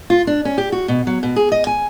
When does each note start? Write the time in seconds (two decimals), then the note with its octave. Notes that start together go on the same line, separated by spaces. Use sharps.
0.10 F4
0.27 D4
0.45 C#4
0.58 G4
0.72 F#4
0.88 B2
1.07 F#3
1.23 B2
1.36 G#4
1.52 D#5
1.67 G#5